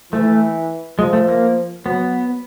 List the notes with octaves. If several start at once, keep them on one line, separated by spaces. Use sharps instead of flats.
E3 A3
F3 G#3
A3
A#3
F#3 B3